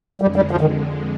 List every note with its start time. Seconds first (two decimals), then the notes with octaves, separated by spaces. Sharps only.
0.22 F2 D3 G3 G#3
0.36 G3
0.51 F3
0.61 D#3